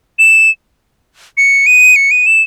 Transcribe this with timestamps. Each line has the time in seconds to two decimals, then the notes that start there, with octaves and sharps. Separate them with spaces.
0.19 E7
1.37 C#7
1.67 D#7
1.96 C#7
2.11 D#7
2.26 E7